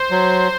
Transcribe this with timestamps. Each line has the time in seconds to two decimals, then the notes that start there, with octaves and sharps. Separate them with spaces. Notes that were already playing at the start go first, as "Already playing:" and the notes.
Already playing: C5
0.11 F#3